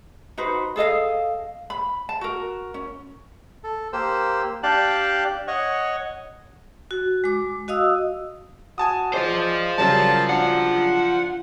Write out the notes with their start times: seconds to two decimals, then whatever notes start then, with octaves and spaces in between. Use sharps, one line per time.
0.38 D#4 F#4 B4 C5
0.76 G#4 A4 D#5 F5
1.70 B5
2.09 A5
2.21 F#4 A#4
2.74 C#4
3.64 A4
3.93 A#3 G4 C5 E6
4.63 D4 G4 F5 G5 A5 F#6
5.48 C#5 D#5 F#5 C#6
6.91 F#4
7.24 G#3 D6
7.68 F#4 D#5 F5 D#6 E6
8.78 F#4 G#5 A5 D#6
9.14 G#3 F4 C5 D5
9.78 A#2 C#3 F#3 G3 A5
10.29 D4 F#5